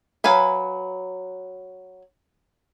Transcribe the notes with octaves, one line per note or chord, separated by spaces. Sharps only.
F#3 B4 F5 G#5 B5